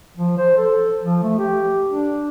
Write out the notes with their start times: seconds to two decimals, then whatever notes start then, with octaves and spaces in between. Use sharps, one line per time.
0.17 F3
0.38 C5
0.57 A4
1.03 F3
1.23 A3
1.39 G4
1.91 D4